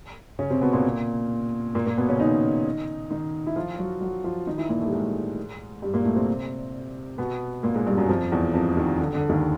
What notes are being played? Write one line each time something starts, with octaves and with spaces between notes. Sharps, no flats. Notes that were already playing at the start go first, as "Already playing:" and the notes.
C#3 C#4
C3 C4
B2 B3
A#2 A#3
A#2 A#3
A#2 A#3
B2 B3
C#3 C#4
D#3 D#4
D#3 D#4
E4
F3 F4
F#3 F#4
F#3 F#4
F3 F4
D#3 D#4
E3 E4
A#2 A#3
A2 A3
G3
G#2 G#3
G2 G3
A#2 A#3
A2 A3
C3 C4
B2 B3
A#2 A#3
G#2 G#3
G2 G3
F#2 F#3
F2 F3
E2 E3
F2 F3
D#2 D#3
D3
D3
D#2 D#3